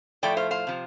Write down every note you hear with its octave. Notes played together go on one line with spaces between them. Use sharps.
A2 F3 A3 D5 G5
C5 F5
C5 F5
C3 F3